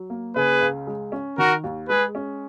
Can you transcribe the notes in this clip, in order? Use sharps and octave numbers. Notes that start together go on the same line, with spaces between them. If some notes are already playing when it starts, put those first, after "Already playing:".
Already playing: F#3
A#3
C#3 G#4 B4
C#2
G#3
C#4
D#3 F#4 A#4
D#2
G#3 G#4 B4
C#4